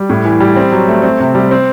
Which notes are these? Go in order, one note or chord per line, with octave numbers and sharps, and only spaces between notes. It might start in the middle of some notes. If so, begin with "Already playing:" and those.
Already playing: G3
A2
E3
G3
C4
F#3
A3
C4
C3
G3
C4